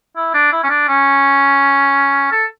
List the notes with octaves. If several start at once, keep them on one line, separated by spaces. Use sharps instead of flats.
E4
D4
E4
C#4
D4
C#4
A4